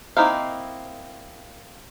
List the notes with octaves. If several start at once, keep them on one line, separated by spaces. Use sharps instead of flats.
A#3 C4 D#4 E4 F5